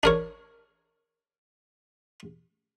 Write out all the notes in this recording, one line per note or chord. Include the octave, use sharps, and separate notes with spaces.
D4 A#4 C#5